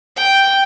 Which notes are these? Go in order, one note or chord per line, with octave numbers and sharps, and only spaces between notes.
G5